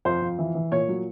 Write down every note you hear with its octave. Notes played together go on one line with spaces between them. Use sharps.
F2 C5
F2
E3
E3
A#2 C#5
F#3